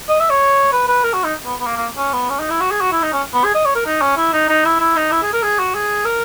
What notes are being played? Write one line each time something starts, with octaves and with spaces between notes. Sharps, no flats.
D#5
E5
C#5
B4
B4
A#4
F#4
D#4
B3
B3
A#3
A#3
C#4
B3
C#4
D#4
E4
F#4
G#4
F#4
E4
D#4
C#4
B3
G#4
D#5
C#5
A#4
D#4
C#4
E4
D#4
D#4
E4
E4
D#4
E4
G#4
A#4
G#4
F#4
G#4
A#4